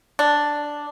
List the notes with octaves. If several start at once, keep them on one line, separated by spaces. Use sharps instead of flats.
D4